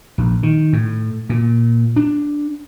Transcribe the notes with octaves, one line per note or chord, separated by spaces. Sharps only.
A#1
D#3
A2
A#2
D4